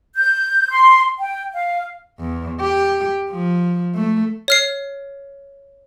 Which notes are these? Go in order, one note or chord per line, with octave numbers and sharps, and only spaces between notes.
G6
C6
G5
F5
E2
G4
F3
A3
C#5 F6 C7